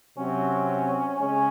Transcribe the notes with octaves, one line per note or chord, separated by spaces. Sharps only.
C3 F#3 C4 C#4
C#3 G#3 C#4